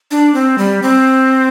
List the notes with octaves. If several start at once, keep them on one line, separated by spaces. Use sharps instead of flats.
D4
C4
G3
C4